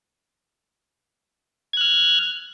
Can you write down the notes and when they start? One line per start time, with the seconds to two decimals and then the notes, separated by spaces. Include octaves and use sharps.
1.73 G#6
1.77 F#6
1.81 F6